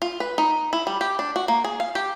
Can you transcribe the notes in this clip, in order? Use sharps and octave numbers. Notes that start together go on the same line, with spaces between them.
F4
B4
D#4
E4
G3
G4
D4
F#4
A#3
G#4
F5
G4